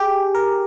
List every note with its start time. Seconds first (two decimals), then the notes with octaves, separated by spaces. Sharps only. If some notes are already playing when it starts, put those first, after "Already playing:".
Already playing: G4 G#4
0.35 A#4